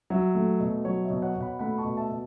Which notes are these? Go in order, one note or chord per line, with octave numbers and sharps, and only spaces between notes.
F#3 E5
A3
B2
F#3 C#5
E5
B2
C#5 F#5
B2
F#5 B5
A3 F#5 B5
A5 C#6
B2
E5 A5
B2